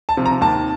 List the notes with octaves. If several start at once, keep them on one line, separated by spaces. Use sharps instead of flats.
A5
C3 F3
A#5
D#2 A5